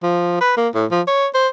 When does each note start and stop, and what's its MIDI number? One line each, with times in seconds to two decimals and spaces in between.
0.03 0.40 53
0.41 0.53 71
0.57 0.68 58
0.75 0.85 45
0.91 1.01 53
1.07 1.27 73
1.34 1.48 72